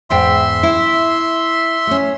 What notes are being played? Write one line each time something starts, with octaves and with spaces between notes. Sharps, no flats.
E2 G#2 E5 G5 C6
E4
A3 C#4